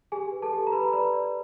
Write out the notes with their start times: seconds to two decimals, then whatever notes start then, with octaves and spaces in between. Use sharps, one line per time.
0.12 G4 G#4 G#5
0.32 B4
0.42 A4 A5
0.53 G4
0.67 A#5
0.72 G4 B4 B5
0.85 A#5
0.93 B4 D5 B5
1.13 D5